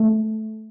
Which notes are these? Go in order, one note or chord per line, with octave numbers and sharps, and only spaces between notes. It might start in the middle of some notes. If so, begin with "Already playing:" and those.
Already playing: A3